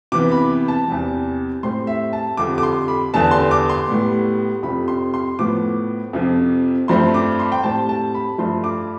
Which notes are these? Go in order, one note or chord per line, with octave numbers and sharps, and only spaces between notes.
C3 E3 B3 D6
B5
A5
E2 C3 G3
A2 G3 C4 C6
E5
A5
F2 D3 G3 D6
D6
C6
B5
E2 D3 G3 B3 A5
C6
D6
C6
A2 G3 B3
F2 C3 G3 C4 B5
C6
C6
A2 F3 B3 D6
F2 C3 F3
G2 F3 A3 C4 C6
D6
C6
G5
A2 G3 C4 A5
A5
B5
G2 F3 A3 C6
D6